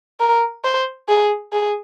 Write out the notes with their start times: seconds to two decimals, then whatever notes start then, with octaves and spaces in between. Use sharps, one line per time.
0.20 A#4
0.64 C5
1.09 G#4
1.52 G#4